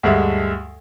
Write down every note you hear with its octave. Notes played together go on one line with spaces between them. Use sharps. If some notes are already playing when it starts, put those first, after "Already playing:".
D2 G2 G#3 E5